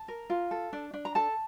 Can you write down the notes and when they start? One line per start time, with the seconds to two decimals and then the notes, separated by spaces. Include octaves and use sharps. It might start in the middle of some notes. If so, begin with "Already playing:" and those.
Already playing: A5
0.08 A#4
0.30 F4
0.51 A4
0.73 D4
0.94 D4
1.05 A#5
1.15 A4 A5